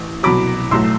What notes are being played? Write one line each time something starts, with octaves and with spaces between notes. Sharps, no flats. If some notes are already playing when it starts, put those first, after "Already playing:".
Already playing: A1
C2 B2 F#3 B5 D6
B1 A2 F#3 A3 C6 E6